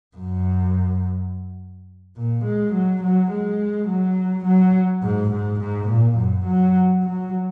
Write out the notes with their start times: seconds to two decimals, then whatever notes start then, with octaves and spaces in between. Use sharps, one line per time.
0.17 F#2
2.17 A#2
2.45 G#3
2.74 F#3
3.03 F#3
3.31 G#3
3.88 F#3
4.45 F#3
5.03 G#2
5.31 G#2
5.60 G#2
5.89 A#2
6.17 F#2
6.46 F#3
7.03 F#3